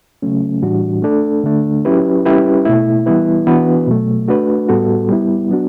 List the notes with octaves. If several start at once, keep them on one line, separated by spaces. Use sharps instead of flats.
C#3 F#3 A3 C#4
A2 E3 G3 D4 F#4
A3 D4 A4
D3 A3 D4
F#3 C#4 E4 G4 B4
G3 C#4 E4 G4 B4
B2 A3 E4
E3 G3 B3 E4 B4
E3 B3 D4 F#4 B4
B2 F#3 A3
A3 D4 F#4 B4
A2 G3 B3 F#4 A4
G3 B3 E4
F#3 B3 D4 F#4